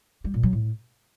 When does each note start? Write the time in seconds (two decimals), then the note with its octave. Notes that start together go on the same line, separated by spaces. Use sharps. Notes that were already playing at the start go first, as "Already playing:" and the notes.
0.24 G3
0.34 A#2
0.43 F#3
0.53 A2